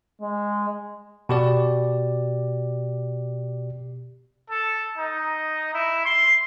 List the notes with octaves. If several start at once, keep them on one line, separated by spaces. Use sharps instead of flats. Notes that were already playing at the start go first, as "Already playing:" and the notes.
G#3
B2 G4 D5
A4
D#4
E4
C6